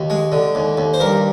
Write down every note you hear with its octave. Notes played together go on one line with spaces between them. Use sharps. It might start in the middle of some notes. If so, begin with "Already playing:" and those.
Already playing: D#2
G#3
D3
D#2
D#2
C5
G2 A#4